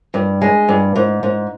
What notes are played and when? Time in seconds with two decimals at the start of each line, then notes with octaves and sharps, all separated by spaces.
0.14 G2
0.42 G#3
0.68 G2
0.96 G#2
1.23 G#2